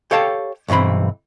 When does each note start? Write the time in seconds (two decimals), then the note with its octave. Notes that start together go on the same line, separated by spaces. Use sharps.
0.11 G4 A4 C#5 F5 G5 A5
0.68 B1 G2 E3 C4 B5